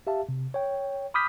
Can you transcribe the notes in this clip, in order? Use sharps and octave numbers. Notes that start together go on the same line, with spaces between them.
G4 E5 F5 A5
C3
C#5 G5
B5 D6 D#6 F6 G6 B6